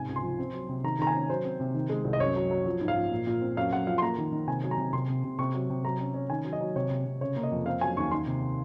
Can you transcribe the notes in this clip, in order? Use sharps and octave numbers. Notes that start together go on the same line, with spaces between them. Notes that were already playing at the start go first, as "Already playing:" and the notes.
Already playing: G#2 C3 G#5
C#2
C6
F3
C4
F#3
C3
D#3 A#5
D#3 A#5
G#5
C#4
F#3 C5
C4
C3
D#3
G#3
C2
D#5
F#2 C#5
F#3
F#3
F3
G#2
F5
F3
A#2
A#2
C4
F#2 F5
F#2 F#5
F3 F5
C6
A#3 A#5
D#3
D#3
C3 G#5
F#3
A#5
C3
C3 C6
C3
C3
C3 C#6
F#3
C3
F#3 A#5
C#4
C#4
D#3 G#5
F#3
D#5
F#3
C3 C#5
C3
C3
C#3 C#5
A#3
D#5
F2
C4 F5
F#3 G#5
D#2 C#6
D#3 C6
C3